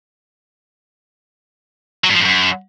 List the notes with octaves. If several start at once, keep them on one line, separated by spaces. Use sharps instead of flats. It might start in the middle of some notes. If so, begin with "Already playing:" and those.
F#3
G2
F3
G2
F#2